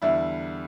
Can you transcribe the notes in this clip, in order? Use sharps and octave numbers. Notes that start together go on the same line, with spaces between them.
E2 D3 G3 E4 E5